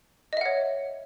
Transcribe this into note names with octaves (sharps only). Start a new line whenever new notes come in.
C#5 D#5 E5 F#5